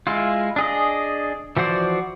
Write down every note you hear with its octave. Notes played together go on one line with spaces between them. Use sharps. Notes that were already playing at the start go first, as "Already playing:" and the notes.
G#3 E4 F4
D4 G#4 D#5
E3 F3 F#4 C5 D5